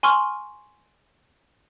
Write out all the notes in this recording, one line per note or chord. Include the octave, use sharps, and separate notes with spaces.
G#5 C6 C#6 F6